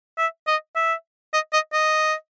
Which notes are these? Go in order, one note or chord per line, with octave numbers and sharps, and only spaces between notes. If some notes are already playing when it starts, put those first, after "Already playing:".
E5
D#5
E5
D#5
D#5
D#5